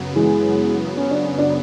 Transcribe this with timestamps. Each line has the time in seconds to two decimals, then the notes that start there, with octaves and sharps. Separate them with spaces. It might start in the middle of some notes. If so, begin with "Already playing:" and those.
Already playing: F#2 C#3 F#3 B3
0.16 E3 G#3
0.97 C#4
1.11 D4
1.25 C#4
1.38 D4